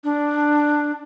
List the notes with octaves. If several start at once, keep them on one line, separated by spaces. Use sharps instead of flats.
D4